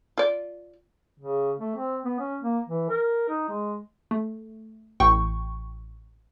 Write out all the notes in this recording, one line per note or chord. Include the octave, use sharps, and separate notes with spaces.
F4 D5
C#3
A3
C4
B3
C#4
A#3
E3
A#4
D#4
G#3
A3
A1 G5 C#6